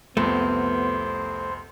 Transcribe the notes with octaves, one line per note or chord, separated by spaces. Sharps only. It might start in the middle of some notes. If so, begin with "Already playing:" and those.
C2 F2 A3 B3 C5